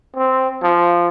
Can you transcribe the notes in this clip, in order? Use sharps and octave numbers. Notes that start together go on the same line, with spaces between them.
C4
F3